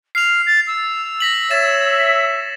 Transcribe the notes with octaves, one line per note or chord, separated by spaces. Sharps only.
F6 C7 F7
A6
E6
A#6 B6 F#7
C#5 E5 A6 E7